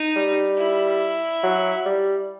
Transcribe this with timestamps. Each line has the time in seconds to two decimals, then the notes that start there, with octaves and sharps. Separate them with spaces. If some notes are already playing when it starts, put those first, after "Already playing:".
Already playing: D#4
0.16 G3
0.58 E4
1.43 F#3
1.86 G3